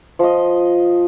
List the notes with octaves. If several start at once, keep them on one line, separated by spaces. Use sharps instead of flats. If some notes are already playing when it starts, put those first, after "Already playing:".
F3 D#5